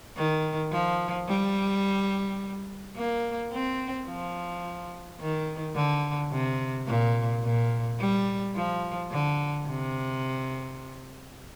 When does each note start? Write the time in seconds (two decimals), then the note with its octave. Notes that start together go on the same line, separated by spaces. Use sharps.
0.17 D#3
0.72 F3
1.28 G3
2.96 A#3
3.52 C4
4.08 F3
5.20 D#3
5.75 D3
6.32 C3
6.87 A#2
7.44 A#2
8.00 G3
8.56 F3
9.11 D3
9.67 C3